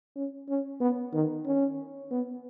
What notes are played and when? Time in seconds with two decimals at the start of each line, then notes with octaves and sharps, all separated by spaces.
0.16 C#4
0.49 C#4
0.80 B3
1.13 D#3
1.46 C#4
2.11 B3